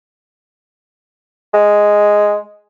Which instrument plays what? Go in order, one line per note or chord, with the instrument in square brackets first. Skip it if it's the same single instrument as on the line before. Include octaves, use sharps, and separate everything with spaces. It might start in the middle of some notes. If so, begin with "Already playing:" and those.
[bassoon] G#3